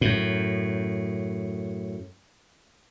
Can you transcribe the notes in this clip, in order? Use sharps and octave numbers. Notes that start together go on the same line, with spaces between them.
F#2 A2